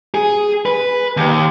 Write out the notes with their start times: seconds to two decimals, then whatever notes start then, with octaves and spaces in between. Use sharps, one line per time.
0.14 G#4
0.66 B4
1.17 D#2